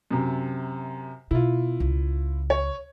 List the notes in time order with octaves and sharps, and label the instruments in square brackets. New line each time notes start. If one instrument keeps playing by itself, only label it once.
[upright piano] F#2 C3
[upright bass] B2 [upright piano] E4 F4
[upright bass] C#2
[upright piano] C#5